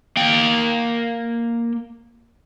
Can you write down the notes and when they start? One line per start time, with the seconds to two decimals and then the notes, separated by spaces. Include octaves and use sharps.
0.17 A#3 G5